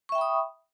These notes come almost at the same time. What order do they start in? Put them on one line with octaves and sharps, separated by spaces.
C#6 E5 G5 B5 D#6